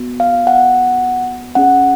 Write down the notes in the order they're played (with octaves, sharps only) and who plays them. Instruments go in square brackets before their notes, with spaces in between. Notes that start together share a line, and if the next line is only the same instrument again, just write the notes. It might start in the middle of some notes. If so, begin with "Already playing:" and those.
Already playing: [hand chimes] B3 F#4
F5
F#5
C#4 G#4 F#5